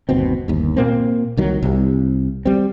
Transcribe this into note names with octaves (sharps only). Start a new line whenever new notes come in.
G1 D#2 B2 C4
G1 D#2
A#2 A#3 C4
C2 D#3 F#3
C2 C3
G3 C4